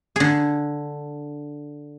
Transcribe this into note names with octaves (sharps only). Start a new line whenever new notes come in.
D3 G#4